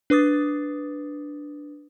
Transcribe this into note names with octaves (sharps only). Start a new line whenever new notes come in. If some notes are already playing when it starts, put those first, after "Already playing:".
D4 B4 D6 D#6 A6